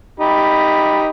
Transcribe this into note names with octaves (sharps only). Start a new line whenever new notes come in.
D#4 G4 B5